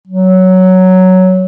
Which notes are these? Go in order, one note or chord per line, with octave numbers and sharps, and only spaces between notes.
F#3